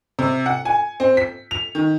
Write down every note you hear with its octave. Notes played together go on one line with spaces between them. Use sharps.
C3
F#5
G#5
C4
B6
F7
D#3